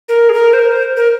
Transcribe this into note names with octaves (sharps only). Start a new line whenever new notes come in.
A#4
G#4
A#4
C5
A#4
C5
A#4